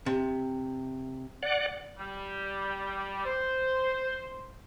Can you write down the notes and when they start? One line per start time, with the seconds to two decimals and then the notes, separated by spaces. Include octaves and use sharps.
0.06 C3
1.43 D5 F#5
1.98 G3
3.25 C5